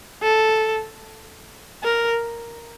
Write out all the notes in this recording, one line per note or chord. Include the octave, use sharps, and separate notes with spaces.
A4
A#4